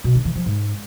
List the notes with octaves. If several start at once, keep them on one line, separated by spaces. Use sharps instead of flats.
B2
D3
E3
F3
G#2